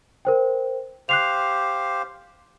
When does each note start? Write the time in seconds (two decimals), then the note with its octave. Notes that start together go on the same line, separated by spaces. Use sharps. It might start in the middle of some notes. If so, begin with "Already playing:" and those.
0.25 A#4 C5 G5
1.09 G4 C5 F5 F#6 C7 F7